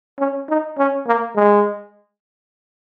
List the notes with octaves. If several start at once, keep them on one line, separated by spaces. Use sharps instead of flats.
C#4
D#4
C#4
A#3
G#3